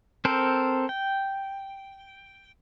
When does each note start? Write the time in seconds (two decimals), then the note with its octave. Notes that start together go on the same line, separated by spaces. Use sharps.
0.25 C4 A4 A#4 C5
0.89 G5